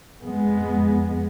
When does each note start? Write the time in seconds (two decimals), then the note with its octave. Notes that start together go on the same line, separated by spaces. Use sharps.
0.22 F2 G#3 B3